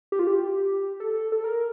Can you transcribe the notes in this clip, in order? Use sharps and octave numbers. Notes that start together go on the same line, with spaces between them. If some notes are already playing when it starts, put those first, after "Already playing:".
G4
F4
G4
A4
A4
A#4